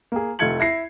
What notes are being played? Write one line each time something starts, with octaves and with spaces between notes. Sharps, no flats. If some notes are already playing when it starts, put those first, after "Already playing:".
A#3 G#4
F1 A3 F4 G#6 C#7 F#7
E4 A#6 C7